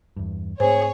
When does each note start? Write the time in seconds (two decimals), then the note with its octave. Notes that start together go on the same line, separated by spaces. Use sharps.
0.16 E2 G2
0.60 G#2 A3 C4 G#4 C5 C#5